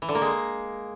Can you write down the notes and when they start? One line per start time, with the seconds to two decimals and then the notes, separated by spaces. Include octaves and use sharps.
0.02 E3
0.09 D3
0.15 A#3
0.22 G#3